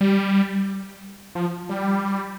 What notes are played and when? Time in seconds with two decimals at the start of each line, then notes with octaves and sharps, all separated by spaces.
0.01 G3
1.35 F3
1.69 G3